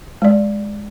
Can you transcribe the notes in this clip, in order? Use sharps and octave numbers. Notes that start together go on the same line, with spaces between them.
G#3 D5